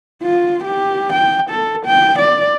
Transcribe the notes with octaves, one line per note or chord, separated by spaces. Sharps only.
F4
G4
G5
A4
G5
D5